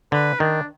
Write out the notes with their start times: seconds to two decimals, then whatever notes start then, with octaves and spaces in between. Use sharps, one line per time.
0.12 D3 B4
0.40 D#3 D4